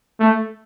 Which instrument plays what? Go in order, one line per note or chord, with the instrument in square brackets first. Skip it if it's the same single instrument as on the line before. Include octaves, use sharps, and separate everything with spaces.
[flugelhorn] A3